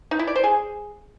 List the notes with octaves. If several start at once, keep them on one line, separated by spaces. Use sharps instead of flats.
D#4
E4
D5
C5
G#4